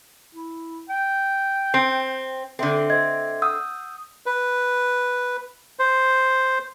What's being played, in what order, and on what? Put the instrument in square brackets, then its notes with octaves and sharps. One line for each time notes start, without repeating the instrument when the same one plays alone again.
[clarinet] E4
G5
[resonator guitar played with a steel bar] C4
[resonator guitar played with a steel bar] D3 C4 [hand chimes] A4 E5 C6
[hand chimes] C5 E5 C6 [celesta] D#5 G#6
[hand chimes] F#5 [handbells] D#6 G6 [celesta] E6
[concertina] B4
C5